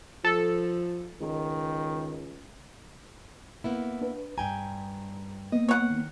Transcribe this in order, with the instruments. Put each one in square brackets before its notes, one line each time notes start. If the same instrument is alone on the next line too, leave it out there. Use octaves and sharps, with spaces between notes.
[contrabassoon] F3 [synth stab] A4
[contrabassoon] C#2 [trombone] D#3
[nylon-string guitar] A#3 B3 E4
[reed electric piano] D4 B4
[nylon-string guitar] G2 G5 G#5 [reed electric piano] A#5
[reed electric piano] A#3 B3 [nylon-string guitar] D#5
[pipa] C#5 F#5
[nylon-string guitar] D#3